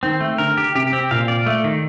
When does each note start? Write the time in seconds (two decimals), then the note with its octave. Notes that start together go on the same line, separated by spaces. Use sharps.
0.03 D#3 C4
0.20 A3
0.38 D3 A#4
0.57 G4
0.75 C3 G4
0.93 C4
1.11 A#2 F5
1.28 D5
1.46 A3
1.64 D#3